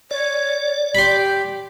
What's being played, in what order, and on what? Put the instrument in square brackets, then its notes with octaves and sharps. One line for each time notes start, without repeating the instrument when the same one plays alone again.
[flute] C#5 [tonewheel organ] D5
[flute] G4 [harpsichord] B5 C6